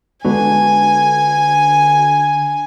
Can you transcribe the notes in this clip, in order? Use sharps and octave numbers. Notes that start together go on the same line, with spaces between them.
D3 G#3 B3 D4 F#4 B4 G#5